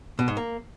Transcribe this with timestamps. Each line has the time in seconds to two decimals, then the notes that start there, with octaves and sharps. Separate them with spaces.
0.19 B2
0.28 G#2
0.37 A#3